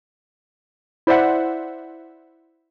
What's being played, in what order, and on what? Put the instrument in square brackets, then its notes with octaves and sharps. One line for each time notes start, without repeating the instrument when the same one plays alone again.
[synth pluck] E4 C5 D5 E5 F#5